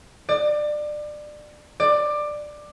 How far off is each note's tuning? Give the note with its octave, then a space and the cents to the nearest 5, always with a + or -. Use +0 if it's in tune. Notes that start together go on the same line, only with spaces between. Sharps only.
D5 +25
D5 +15